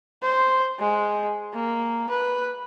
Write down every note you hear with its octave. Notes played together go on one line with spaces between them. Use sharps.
C5
G#3
A#3
B4